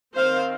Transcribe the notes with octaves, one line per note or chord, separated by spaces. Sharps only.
D#3 C4 C5 F5